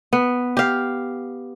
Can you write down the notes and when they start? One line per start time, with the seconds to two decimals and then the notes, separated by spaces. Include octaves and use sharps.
0.13 B3
0.57 G4 F5